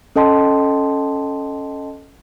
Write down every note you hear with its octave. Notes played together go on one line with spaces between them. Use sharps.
C#4 A4 D#5 G5 A5 C6